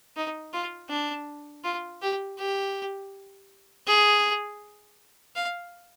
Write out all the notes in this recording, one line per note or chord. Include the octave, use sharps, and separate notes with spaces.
D#4
F4
D4
F4
G4
G4
G#4
F5